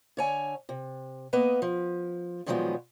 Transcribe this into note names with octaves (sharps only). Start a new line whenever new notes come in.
D3 C#5 G#5
C3
A#3 B3 B4 D#5
F3
A#2 D#3 F3 F#3 G#3 B3